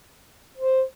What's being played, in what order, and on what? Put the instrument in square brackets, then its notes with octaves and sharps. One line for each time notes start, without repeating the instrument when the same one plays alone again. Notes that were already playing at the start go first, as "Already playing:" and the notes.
[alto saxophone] C5